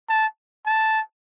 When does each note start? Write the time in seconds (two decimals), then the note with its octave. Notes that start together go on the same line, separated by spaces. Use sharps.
0.09 A5
0.66 A5